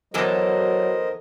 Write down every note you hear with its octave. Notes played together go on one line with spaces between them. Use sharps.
E2 E3 F#3 A4 A#4 C5 D#5